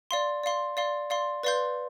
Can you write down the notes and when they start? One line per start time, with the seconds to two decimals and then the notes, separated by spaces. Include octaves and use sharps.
0.11 D5 F5 C6
0.43 D5 F5 C6
0.77 D5 F5 C6
1.10 D5 F5 C6
1.43 B4 D5 F5 C6 G6